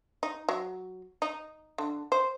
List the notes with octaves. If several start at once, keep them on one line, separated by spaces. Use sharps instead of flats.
D#4
F#3
D#4
D3
C5